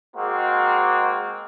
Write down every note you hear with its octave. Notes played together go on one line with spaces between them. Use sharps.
G#3 A#3 C4 F#4